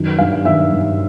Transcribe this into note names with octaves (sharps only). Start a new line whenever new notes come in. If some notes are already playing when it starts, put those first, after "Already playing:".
Already playing: F#2 D#3
G2 F5
D#3 E5
G2